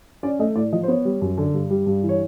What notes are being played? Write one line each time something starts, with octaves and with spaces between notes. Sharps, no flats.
C#4 D5
A3 D#5
A2 D5
F3 D#5
C5
B3 C#5
G3
F#2
D3
G2
G3
G2
E3
C#5